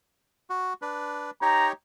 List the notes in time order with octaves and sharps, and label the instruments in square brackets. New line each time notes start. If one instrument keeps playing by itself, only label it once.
[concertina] F#4
D4 B4
[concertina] D#4 G4 C#5 [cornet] A#5